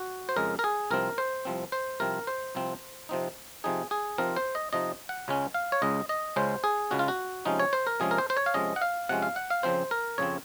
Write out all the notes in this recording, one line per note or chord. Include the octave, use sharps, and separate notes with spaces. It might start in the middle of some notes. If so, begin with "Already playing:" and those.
Already playing: F#4
C5
F2 C#3 G#3 A#4
A#4
G#4
C2 C3 F3 C4 A#4
C5
C2 C3 F3 C4
C5
C2 C3 F3 C4 A#4
C5
C2 C3 F3 C4
C3 F3 C4 D#4
C3 F3 C4 D#4 G#4
G#4
C3 F3 C4 D#4 A#4
C5
D#5
C3 F3 C4 D#4 D#5
F#5
C#2 C#3 G#3 C#4
F5
C#5
C#2 C#3 G#3 C#4 D#5
D#5
C#2 C#3 G#3 C#4 C5
G#4
C#2 C#3 G#3 C#4 F#4
F4
F#4
C3 F3 G#3 C#4 D#4
C#5
C5
A#4
C3 F3 G#3 C#4 G#4
A#4
C5
C5
C#5
F5
C3 F3 G#3 C#4 D#5
F#5
F5
C3 F3 G#3 C#4 F#5
F5
F#5
F5
F2 C#3 F3 C4 C5
A#4
F2 C#3 F3 C4 C#5